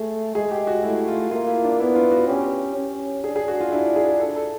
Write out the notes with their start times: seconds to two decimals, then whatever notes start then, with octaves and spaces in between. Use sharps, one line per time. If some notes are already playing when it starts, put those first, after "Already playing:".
Already playing: A3 G#4
0.35 G#3 G#4
0.51 G4
0.67 F#4
0.83 A3 E4
1.08 F4
1.31 A#3 F4
1.47 E4
1.65 D4
1.80 B3 E4
1.95 F4
2.11 F#4
2.28 C#4 G4
2.76 C#4
3.24 D4 G#4
3.36 G#4
3.48 F#4
3.60 F4
3.72 D4 E4
3.96 G#4
4.20 A4
4.36 A4